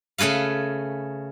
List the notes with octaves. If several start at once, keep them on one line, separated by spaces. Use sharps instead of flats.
C#3 A3 G#4 B4 F5